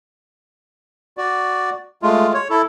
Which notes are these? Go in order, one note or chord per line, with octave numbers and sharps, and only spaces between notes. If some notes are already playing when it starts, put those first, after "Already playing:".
F#4 D5
G#3 A3 F4
C#5
E4 A4